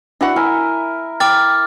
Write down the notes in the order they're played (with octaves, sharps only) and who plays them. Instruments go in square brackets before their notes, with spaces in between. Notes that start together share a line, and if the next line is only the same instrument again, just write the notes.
[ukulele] D4 F#4 F#5 [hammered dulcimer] E4
[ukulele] E4 [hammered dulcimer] A#4 E5 G#5
[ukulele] G5 [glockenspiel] D6 F6 A6